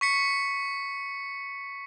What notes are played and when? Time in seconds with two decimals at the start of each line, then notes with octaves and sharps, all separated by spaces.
0.01 C#6 B6 C#7